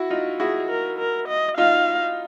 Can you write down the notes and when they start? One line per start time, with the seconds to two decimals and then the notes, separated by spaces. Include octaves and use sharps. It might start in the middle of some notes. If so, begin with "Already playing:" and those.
Already playing: E4 F#4
0.10 D#4 F4
0.40 E4 F#4 G#4
0.70 A#4
0.99 A#4
1.28 D#5
1.58 D#4 F4 F5